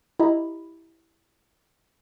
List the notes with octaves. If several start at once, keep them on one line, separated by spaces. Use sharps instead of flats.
E4 G4 D#5 A#5 B5